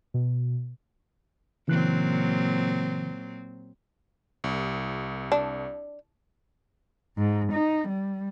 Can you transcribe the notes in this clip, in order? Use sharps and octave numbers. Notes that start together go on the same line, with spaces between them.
B2
A#2 C#3 E3 F#3 C4 F#6
C2
D4
G#2
D#4
G3